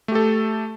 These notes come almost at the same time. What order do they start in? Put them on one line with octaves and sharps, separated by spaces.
A3 G4 A4